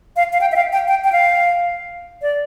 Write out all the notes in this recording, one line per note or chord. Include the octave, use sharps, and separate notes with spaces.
F5
F5
G5
E5
F5
G5
G5
G5
F5
D5